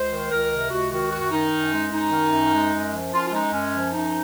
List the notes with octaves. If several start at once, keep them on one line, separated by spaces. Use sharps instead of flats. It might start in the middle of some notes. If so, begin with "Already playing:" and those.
Already playing: C#2 C5
D#3
C#2 A#4
C3
C#2 F#4
D#3 F#4
F#2 F#4
D#3 D#4
F#2
G#3
F#2 D#4
D#3
F#2
G#3
F#2
F3
F#2 F4
F4
G#3 D#4
F#2 C#4
F3
F#2 D#4